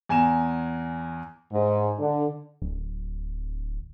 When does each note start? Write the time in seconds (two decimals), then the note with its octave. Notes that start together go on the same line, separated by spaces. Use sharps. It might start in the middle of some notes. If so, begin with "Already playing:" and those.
0.09 E2 G#5 A#5 E7
1.53 G#2
1.99 D3
2.62 D1